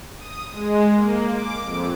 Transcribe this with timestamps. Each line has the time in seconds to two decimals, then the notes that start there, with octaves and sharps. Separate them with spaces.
0.17 D#6
0.51 G#3
0.95 A#3
1.26 D6
1.64 F2